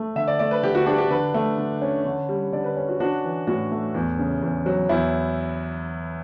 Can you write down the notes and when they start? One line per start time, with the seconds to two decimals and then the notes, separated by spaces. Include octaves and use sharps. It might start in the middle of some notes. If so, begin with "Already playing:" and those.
Already playing: A3
0.16 D3 E5
0.28 D5
0.39 A3 D5
0.51 B4
0.63 D3 G4
0.75 F#4
0.86 D4 G4
0.98 G4
1.10 D3 B4
1.34 A3
1.57 D3
1.82 C#4
2.05 D3
2.29 G3
2.52 D3 D5
2.64 B4
2.77 C#4
2.88 F#4
3.00 D4 F#4
3.24 E3
3.47 A2 F#4
3.71 A3
3.94 E2
4.19 C#3
4.42 E2
4.66 F#3
4.89 E2 E4